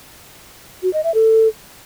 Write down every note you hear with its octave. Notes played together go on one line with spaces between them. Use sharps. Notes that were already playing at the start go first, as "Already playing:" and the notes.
F#4
D#5
E5
A4